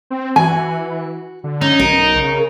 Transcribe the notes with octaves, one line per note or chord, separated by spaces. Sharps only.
C4
E3 F#4 G#5
D3
C#4 D#4
B1 A#4
C#3